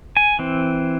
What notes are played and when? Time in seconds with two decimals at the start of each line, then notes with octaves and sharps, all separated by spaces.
0.17 G#5
0.39 E3 C4